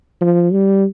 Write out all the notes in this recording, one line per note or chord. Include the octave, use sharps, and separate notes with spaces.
F3
G3